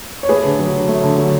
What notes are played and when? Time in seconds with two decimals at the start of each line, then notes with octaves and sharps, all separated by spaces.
0.23 C#5
0.29 A3 G#4 B4
0.45 D3
0.59 F#3
0.74 D3
0.88 A3
1.04 D3
1.18 F#3